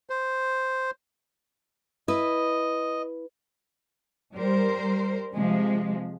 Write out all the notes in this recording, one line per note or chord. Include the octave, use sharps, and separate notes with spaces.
C5
E4 B4 D#5
G3 A#4 C5
C3 F3 G#3